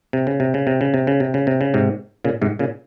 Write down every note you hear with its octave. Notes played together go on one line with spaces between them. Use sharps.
C3
C#3
C3
C#3
C3
C#3
C3
C#3
C3
C#3
C3
C#3
G#2 C3
A#2 C#3
G#2 C3
A#2 C#3